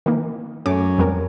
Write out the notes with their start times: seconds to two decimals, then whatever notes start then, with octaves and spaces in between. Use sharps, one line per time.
0.06 D#3 E3 A#3
0.66 F#2 A3 C#4 D6
0.98 F2 G3 A#4